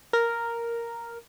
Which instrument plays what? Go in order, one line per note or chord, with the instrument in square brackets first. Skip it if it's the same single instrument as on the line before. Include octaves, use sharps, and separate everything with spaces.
[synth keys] A#4